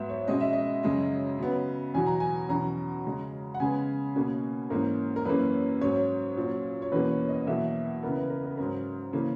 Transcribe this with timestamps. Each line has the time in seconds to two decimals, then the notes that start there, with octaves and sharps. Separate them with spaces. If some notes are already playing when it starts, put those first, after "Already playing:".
Already playing: G#2 F#3 B3 E5
0.09 C#5
0.28 B2 G#3 C#4 D#5
0.40 E5
0.53 D#5
0.83 F#2 C#3 G#3 C#4 D#5
1.38 C#3 F#3 B3
1.94 E2 B2 F#3 G#5
2.07 A#5
2.20 G#5
2.49 E2 B2 F#3 C#4 A#5
3.05 C#3 G#3 C#4
3.54 F#5
3.60 C#3 G#3 B3 G#5
4.16 B2 A#3 C#4
4.70 G#2 E3 A#3 C#4 A#4
5.16 A#4
5.25 F#2 E3 A#3 C#4 B4
5.81 G#2 F#3 C#4 C#5
6.37 A#2 F#3 C#4
6.82 C#5
6.92 E2 B2 A#3 C#4 B4
7.11 C#5
7.29 D#5
7.47 E2 B2 F#3 A#3 E5
8.03 C#3 E3 B3 A#4
8.17 B4
8.30 A#4
8.44 A#4
8.57 G#2 F#3 C#4 A#4
9.13 C#3 E3 A#3 C#4